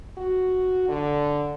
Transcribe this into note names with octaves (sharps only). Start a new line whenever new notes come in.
F#4
D3